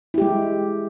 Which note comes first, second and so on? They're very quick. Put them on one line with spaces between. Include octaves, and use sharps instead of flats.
E4 G4 G#3